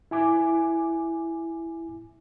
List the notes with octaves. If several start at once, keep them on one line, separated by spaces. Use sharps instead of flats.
E4 G#5 D6